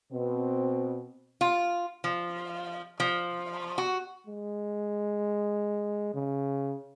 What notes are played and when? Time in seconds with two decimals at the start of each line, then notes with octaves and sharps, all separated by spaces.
0.12 B2 C4
1.41 F4
2.04 F3
3.00 F3
3.78 F#4
4.27 G#3
6.14 C#3